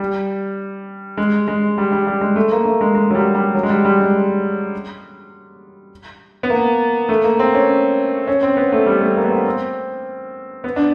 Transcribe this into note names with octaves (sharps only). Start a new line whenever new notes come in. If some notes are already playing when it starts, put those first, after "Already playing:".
Already playing: G3
G#3
G#3
G3
G3
G3
G#3
A3
A#3
A3
G#3
G#3
F#3
G3
G3
F#3
G#3
G3
G3
G#3
B3
A#3
A3
A#3
C4
C#4
C#4
C4
B3
A3
G3
A3
A#3
B3
C4
C4
B3
D4